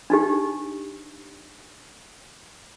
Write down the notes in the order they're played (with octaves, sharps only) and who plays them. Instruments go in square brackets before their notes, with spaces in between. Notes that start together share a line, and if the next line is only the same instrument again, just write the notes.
[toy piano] D4 D#4 G4